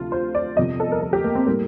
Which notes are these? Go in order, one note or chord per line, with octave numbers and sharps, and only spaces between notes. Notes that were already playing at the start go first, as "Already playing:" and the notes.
Already playing: D2 C3 F3 A3 F4
C5
D5
G1 F2 C3 F3 D#5
A4
A#4
A4
G4
A#3
C4
A2 G3 A#3